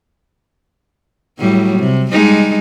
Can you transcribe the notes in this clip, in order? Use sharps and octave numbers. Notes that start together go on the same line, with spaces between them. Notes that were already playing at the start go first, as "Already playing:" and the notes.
A2 F#3 G3
C3
G3 G#3 D#4